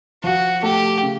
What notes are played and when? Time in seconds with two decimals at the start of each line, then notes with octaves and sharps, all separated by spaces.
0.24 F3 F#4
0.63 A3 G4
1.02 C#3